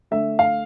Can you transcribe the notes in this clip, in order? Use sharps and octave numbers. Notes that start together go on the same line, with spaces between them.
D3 A3 E5
F5